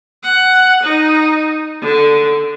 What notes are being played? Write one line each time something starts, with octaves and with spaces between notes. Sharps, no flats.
F#5
D#4
D3